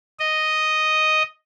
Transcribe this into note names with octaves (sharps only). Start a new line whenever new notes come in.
D#5